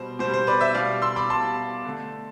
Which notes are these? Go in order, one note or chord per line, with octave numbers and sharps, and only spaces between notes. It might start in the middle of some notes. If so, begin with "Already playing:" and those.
Already playing: B2 G3 C5
B2 G3 C5
C5
B4 D5
C5 E5
B2 G3 D5 F5
C6 E6
B5 D6
B2 G3 A5 C6
D3 A3